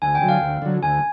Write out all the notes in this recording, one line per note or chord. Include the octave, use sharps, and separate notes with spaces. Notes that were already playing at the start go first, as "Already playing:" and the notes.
D2 G#5
G5
D3 F#3
F5
D2
D3 F#3
D2 G#5